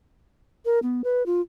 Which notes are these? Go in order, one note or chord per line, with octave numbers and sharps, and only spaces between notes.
A#4
B3
B4
F4